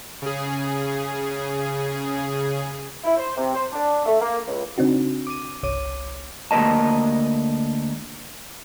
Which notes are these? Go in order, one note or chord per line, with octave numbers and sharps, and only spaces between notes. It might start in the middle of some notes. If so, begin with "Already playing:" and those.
C#3 G#4
E4
C5
C3
C5
D4
A3
A#3
C#2
C#3 C4 D4 D#4 F#4
D6 D#7
G1 C2 C#5 D6 D#7
D2 A#3 A#4 D#5 A5